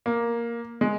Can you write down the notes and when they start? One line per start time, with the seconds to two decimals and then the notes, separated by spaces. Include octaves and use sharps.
0.06 A#3
0.81 G#3